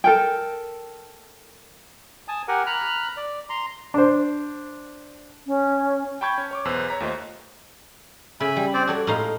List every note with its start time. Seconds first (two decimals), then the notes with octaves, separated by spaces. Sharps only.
0.04 A4 A#4 G5
2.28 G#5 A5 D#6
2.48 G4 A#4 F#5 G#5
2.66 A#5 B5 F6 F#6
3.17 D5
3.49 A#5 C6
3.94 D4 C5
5.46 C#4
6.21 G5 A5 B5 C#6 G6 G#6
6.38 C#4
6.51 C#5 C#6 D6
6.65 B1 E2 B4 C5 E6 F#6
6.88 C#5 A#5 B6
7.00 D#2 A3 F4 C5 D#5
8.40 C#3 E5 G#5 B5
8.56 G3
8.74 C4 C5 D5
8.87 F#4 A4 C#5 D5
9.07 A2 G#3 D#4 F5